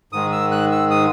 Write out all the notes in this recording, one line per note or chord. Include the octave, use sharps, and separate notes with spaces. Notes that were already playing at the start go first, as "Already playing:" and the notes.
G#2 D#3 G#3 D#6
E6
F#6
E6
D#6